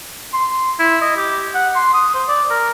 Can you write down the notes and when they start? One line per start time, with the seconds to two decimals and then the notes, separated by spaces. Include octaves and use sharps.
0.34 C6
0.79 E4
1.02 D#5
1.17 G4
1.55 F#5
1.76 C6
1.94 D#6
2.15 C5
2.29 D5
2.50 A#4